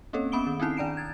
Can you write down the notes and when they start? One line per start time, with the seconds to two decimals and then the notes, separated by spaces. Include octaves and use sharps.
0.13 A#3 C4 C#4 A4 C#5
0.32 B3 C#4 B5 D#6 D7 G7
0.47 D#3
0.60 C4 C#4 D#4 E4 C7
0.77 D#3 D4 D5 A#5 D7 E7
0.97 G#6 A6